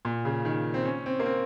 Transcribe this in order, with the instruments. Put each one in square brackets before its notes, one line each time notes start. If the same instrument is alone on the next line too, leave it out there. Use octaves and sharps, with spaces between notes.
[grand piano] A#2
C#3
D#3
C4
C#4
C4
A#3
C4